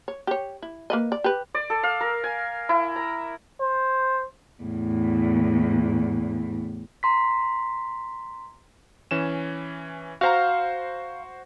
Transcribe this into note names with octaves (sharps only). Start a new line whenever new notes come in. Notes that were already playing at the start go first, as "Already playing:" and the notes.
C#5
G4 C#5
E4
A#3 B4 D#5
D5
G4 B4
D5
A4
F5
A#4
G#5
E4
A#5
C5
E2 A2
A#5 C6 B6
E3 C#4 E7
F#4 C5 F5 A#5